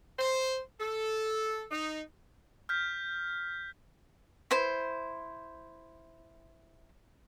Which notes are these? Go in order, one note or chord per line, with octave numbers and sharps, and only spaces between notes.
C5
A4
D#4
F6 G6 B6
E4 C5